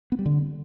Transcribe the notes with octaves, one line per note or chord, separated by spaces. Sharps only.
B3
G3
D3